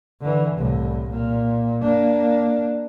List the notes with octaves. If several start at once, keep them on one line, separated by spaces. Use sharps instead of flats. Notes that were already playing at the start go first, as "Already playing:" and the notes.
D3 E3
C2 A2
A#2
A#3 D4